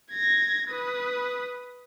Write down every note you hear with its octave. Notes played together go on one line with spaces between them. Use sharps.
G#6 A#6
B4 D#6